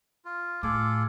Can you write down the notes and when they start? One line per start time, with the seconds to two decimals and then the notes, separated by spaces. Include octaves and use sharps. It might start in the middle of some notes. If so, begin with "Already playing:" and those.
0.25 F4
0.63 A2 F4 G#4 A4 D6